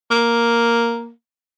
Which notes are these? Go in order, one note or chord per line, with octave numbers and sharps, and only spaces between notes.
A#3